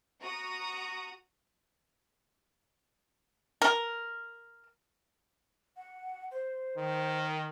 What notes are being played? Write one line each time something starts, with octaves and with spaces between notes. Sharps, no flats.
F#4 A#5 D#6
A#4
F#5
C5
D#3